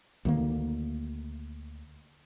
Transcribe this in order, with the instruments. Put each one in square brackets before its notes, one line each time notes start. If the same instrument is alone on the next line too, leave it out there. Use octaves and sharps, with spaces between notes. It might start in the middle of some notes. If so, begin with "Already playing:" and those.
[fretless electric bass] D2 D#3 A#3